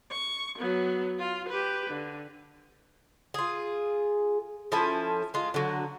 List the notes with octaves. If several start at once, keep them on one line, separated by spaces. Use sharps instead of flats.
C#6
F#3 B3
F4
G4 B4
D3
F4 G#4
F3 C#4 E4 A4
G#3 F4
D3 F#3